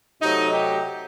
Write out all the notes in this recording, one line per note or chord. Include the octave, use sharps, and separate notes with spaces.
C3 F#3 A3 D#4
G4